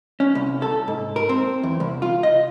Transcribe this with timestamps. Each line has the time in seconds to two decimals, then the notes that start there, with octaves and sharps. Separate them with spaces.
0.20 C#4
0.35 C2
0.62 A4
0.88 G#2
1.16 A#4
1.29 C4
1.63 E2
1.80 C2
2.02 F4
2.23 D#5